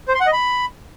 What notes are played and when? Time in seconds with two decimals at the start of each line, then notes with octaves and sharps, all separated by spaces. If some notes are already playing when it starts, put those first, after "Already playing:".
0.08 C5
0.14 C6
0.21 F#5
0.27 D#5
0.33 B5